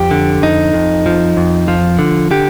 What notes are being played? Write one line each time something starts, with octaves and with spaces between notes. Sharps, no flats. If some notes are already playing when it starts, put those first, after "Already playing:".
Already playing: F2 G4
D3
F2 D#4
F2
F3
F2
F3 F4
D3
D3 G4